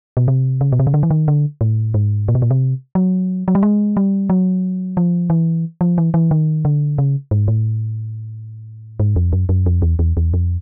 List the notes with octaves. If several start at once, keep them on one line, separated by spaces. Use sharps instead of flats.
B2
C3
C#3
B2
C3
C#3
D3
E3
D#3
D3
A2
G#2
A#2
B2
A#2
C3
F#3
F#3
G3
G#3
G3
F#3
F3
E3
F3
E3
E3
D#3
D3
C#3
G#2
A2
G#2
F2
F#2
F#2
F2
E2
E2
E2
F2